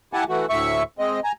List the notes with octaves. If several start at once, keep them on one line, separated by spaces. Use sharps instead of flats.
E4 G4 F#5 G#5 A5
E3 A3 F#4
D2 A2 E5 C#6
G#3 C4 D#5
G#5 A#5